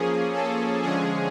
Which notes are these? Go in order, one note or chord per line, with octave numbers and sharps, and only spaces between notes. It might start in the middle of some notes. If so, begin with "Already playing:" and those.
Already playing: F3 A#3 C#4 G#4
A4
D3 F3 G#3 C#4 G#4